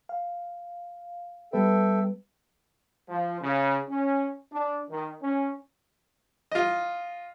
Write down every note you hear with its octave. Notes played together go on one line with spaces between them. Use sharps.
F5
G3 B3 A4 B4 E5 G5
F3
C#3
C#4
D4
D#3
C#4
F4 D#5